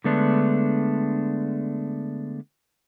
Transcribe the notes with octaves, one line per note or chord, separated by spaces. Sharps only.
D3 G#3 A3 B3 D4